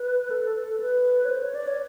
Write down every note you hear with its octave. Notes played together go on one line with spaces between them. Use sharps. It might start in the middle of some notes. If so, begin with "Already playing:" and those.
Already playing: B4
A4
B4
C#5
C5
C#5
D5
C#5